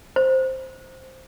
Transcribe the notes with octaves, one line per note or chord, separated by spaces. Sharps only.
C5